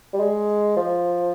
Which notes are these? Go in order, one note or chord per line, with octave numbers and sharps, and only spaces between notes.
G3
G#3
F3